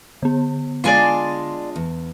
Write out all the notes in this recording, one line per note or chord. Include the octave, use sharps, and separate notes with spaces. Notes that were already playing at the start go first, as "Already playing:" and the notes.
D3 B3
G#3 D4 F4 D5 G#5 C6
E2